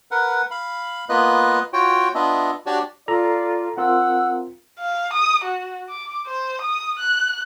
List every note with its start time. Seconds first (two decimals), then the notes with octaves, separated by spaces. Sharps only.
0.11 A#4 B4 F#5
0.51 F5 B5
1.09 A#3 B3 F4 B4 D#5 F#6
1.73 F4 F#4 C#5 G5
2.15 B3 D4 F4 D#5 E5
2.66 D4 F#4 G4 C#5 D5
3.08 F4 A4 D5 A#5
3.77 C4 F4 A#4 F#5 E6
4.79 F5
5.13 D#6
5.44 F#4
5.90 D6
6.27 C5
6.61 D#6
6.99 F#6